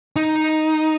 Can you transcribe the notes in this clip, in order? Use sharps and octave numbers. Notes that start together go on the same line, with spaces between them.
D#4